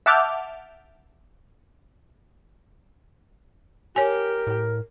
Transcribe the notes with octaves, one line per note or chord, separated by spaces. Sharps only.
E5 F#5 A5 D6 F6 G6
G4 A#4 C#5 G#5
A2